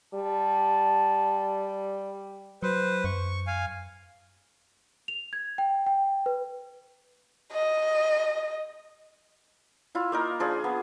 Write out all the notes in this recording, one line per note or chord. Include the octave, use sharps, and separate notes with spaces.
G3 A5
F#3 B4 C5
F#2 C#6
F5 G#5
F7
G#6
G5
G5
B4
D#5
E4 F4
A#3 D#4 A#4
F3 D4 G#4
B3